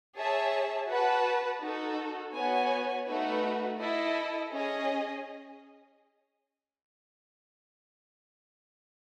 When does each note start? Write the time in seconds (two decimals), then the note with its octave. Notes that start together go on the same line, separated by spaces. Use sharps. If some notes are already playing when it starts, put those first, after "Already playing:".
0.16 G#4 C#5 E5 A5
0.89 F#4 B4 F#5 A5
1.61 D#4 F#4 A4
2.34 B3 F#4 C#5 G#5
3.07 A3 D#4 F#4 B4
3.79 E4 A4 D#5
4.52 C#4 G#4 D#5